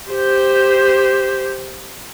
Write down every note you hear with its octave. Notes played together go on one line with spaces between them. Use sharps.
G4 C5